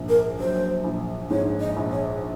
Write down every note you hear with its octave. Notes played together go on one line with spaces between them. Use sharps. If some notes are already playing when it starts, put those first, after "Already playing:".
Already playing: A#1 G#2
A#4
F#3 C5
A#1
G#2 C#5
D#5
A#1
C#5